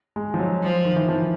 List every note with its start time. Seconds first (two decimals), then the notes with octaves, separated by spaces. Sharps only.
0.16 G#3
0.34 F3
0.39 F#3
0.63 F3
0.85 D#3
0.96 E3
1.09 F3